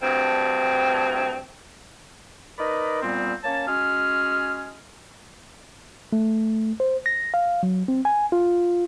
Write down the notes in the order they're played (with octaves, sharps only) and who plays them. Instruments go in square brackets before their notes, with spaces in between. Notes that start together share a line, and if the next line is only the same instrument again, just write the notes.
[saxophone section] D2 G2 C4
[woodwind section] D#4 A#4 B4 D5 D#5 B5
A#2 G3 B3 C4
A#3 C#4 C#5 A5
G#3 C#4 F#4 G#4 F6
[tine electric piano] A3
C5
A#6
F5
F#3
C4
G#5
F4